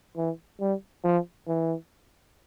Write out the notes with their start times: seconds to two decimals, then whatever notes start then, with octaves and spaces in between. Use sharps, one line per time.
0.17 E3
0.60 G3
1.04 F3
1.48 E3